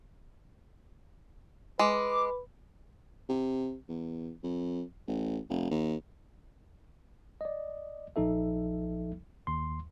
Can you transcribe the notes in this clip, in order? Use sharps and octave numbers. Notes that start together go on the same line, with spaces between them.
G#3 B4 D6
C3
E2
F2
A1
F1
D#2
D5 D#5
A#1 F3 D#4 A4 E5
D#2 C6